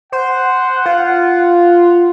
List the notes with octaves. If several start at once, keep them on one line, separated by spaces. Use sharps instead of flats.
C5 F#5
F4